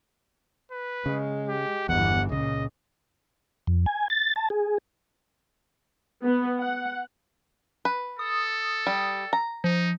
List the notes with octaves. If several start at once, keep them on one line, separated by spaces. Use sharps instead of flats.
B4
C#3 G#3
G4
G1 E2 E3 F#5
C#2 A#2 C#3 D#5
F2
G#5
A6
A5
G#4
B3
F#5
B4
A4 D#6
G3
A#5
F3 D#4